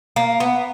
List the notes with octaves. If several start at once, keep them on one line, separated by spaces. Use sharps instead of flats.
A#3
B3